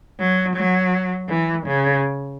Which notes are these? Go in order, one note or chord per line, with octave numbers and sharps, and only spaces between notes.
F#3
F#3
E3
C#3